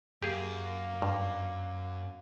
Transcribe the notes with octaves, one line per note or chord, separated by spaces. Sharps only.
F#2 A#3 G4 G#4
G2